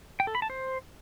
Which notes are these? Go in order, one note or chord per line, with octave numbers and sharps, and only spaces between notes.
G5
A4
B5
A5
C5